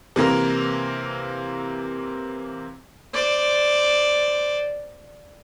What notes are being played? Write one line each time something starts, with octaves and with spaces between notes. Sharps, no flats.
C3 E3 A#3 A#4
C5 D5